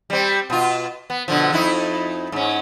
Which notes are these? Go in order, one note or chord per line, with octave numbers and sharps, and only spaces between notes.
G3 C4
B2 F4
B3
B2 D3 F3
F2 D#4 E4
G#2 C#4